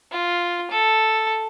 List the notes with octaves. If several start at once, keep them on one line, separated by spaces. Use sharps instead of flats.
F4
A4